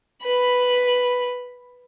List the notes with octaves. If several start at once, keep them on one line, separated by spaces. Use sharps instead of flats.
B4 B5